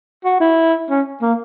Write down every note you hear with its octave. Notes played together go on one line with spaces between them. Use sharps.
F#4
E4
C#4
A#3